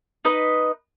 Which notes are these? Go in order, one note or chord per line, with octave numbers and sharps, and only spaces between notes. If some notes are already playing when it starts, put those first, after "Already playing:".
D#4 B4 D#5